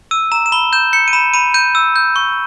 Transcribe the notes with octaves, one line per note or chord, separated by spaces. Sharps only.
E6 D#7
A#5 E7
E7
B5 G7
G6 E7
G6 C#7
D#7
B5 E7
B5 D#7
G6 D#7
E6
G6
C#6